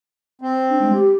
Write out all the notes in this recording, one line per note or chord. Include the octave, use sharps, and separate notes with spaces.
C4
D4
G#3
G4